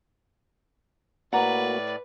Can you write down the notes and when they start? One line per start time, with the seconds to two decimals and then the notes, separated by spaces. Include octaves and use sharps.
1.33 A2 A#3 F#4 B4 D5 F#5 A#5